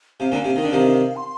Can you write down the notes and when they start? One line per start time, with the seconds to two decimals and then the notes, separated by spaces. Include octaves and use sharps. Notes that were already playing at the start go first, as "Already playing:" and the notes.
0.20 C3 F5
0.32 A#2 D3
0.44 C3
0.56 D#3
0.64 D3
0.72 C3 D#3
1.16 C6